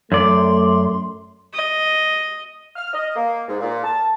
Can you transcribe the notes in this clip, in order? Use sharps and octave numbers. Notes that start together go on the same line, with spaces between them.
F#2 A3 D5 C6
D#5
F6
D#5
A#3
G#2
A#2
A5